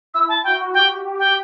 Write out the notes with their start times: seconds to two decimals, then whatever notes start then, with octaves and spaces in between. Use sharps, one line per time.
0.14 E4 E6
0.29 A5
0.44 F#4 G5
0.74 G4 G5
1.03 G4
1.19 G5